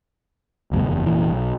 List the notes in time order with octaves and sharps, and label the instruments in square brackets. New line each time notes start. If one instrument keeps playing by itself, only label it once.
[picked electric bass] F1 D2 G2 B2
F#1 E2
F1 A#2 E3
B1